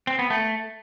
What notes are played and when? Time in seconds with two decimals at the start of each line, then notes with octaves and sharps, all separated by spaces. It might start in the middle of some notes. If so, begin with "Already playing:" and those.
0.07 C4
0.19 B3
0.30 A3